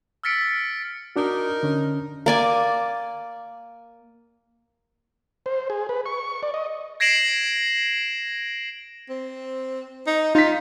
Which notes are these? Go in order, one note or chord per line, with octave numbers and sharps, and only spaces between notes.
E6 F6 A6 B6 C#7 D7
D4 D#4 F#4 A#4
D3 C#4 D4
A#3 D5 G#5
C5
G#4
B4
C#6
D5
D#5
G#6 A#6 C7 D7 E7 F#7
C4
D#4
D#4 F4 B6